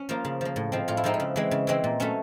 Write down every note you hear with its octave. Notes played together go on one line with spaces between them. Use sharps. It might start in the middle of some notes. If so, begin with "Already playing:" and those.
Already playing: C#4
F3 A#3 F4
C#3
F3 A#3
A2
F3 G#3 C4
A2 F4
E4
F3 G#3 C4 D#4
E4
C#3
E3 G#3 C4
C#3
E3 G#3 C4
A#2
F#3 A3 C#4